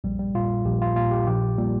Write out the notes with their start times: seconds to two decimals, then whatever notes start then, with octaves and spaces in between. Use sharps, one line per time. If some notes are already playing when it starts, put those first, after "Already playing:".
0.04 A#1 G3
0.19 G3
0.35 A#2 F4
0.65 A#1 G4
0.82 F4
0.96 A#2 F4
1.11 G4
1.27 A#1 G4
1.57 A#2 G3